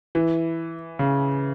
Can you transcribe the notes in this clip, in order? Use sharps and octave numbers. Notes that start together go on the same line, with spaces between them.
E3
C#3